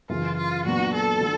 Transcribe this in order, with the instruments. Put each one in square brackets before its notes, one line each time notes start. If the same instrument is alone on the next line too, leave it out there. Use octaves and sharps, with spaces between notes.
[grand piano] F#2 C#3 E3 [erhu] F4
[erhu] F4
[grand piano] A#2 F#3 B3 D4 [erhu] F#4
[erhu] A4
[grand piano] D3